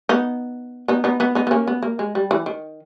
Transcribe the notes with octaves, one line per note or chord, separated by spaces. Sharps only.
B3 D#4
B3 D#4
B3 D#4
B3 D#4
B3 D#4
B3
A#3 C#4
B3
A#3
G#3
G3
E3
D#3